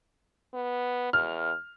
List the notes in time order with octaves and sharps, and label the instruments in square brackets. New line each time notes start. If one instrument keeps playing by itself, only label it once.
[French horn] B3
[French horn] E2 [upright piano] F6